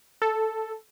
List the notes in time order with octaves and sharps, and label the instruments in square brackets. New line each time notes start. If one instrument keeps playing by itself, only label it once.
[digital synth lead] A4